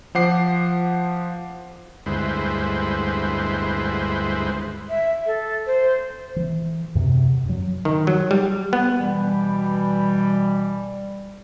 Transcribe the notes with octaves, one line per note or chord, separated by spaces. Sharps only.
F3 C5 F#5 D6 C7
D2 G2 G#3 E4 B4 C5
E5
A4
C5
E3
F#2 C3
F#2 F#3
D#3
F#3
G3
B3
B2 E3 G3